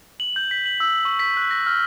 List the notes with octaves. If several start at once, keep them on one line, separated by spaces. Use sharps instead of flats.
F#7
G6
B6
F#7
E6
C#6
B6
F#6
A#6
F6